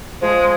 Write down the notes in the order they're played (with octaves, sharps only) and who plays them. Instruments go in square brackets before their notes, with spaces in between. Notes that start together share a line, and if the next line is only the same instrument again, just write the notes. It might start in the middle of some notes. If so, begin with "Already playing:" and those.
[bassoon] F3 [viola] G#3